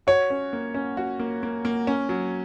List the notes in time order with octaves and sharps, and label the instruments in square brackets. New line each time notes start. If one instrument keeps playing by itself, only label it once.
[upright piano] F#4 [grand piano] C#5
[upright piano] C#4
A#3
C#4
F#4
A#3
A#3
A#3
C#4
F#3